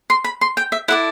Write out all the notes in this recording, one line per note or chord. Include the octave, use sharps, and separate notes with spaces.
C6
B5
C6
G5
E5
E4 A4 D5 F#5